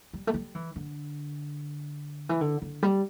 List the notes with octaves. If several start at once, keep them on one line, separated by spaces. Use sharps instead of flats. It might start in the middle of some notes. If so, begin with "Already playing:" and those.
G3
A3
G3
E3
D3
E3
D3
D3
G3